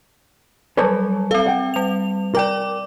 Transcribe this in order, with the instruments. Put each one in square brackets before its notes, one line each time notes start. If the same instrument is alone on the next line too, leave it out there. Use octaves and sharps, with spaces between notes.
[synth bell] F#3 G3 [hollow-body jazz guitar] A4 B4 C#5
[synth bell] C4 F5 [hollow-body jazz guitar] A4
[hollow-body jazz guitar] F#5 G5
[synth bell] G3 F7
[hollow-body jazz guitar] A#4 G5 [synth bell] D5 D6